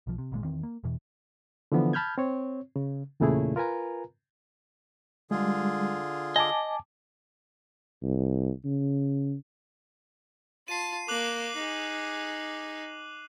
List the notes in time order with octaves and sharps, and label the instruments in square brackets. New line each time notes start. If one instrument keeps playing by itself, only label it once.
[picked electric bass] B1 F3
C3
G#1 A#2 G#3
E2 D#3 E3 C4
A#3
E2 B2 E3
[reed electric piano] D3 E3 F3 B3
A5 B5 F6 G6 G#6
C4 C#5
C#3
E2 A#2 C#3 A3 E4 G#4
F4 A#4 B4 G#5 A#5
[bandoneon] D3 F4 G#4 [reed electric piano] G3 G#3
[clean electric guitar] D#5 [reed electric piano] G#5 A5 D6
[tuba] C2
C#3
[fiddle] F4 A5 [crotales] C7 D#7
[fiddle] A#3 [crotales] D6 F#6 F#7
[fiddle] D#4 G#4